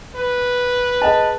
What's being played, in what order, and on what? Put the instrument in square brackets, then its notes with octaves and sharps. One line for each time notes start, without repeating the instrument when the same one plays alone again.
[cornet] B4
[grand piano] G#4 D#5 A5